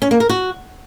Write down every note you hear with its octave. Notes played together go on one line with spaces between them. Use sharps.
C#4
A#3
A#4
F#4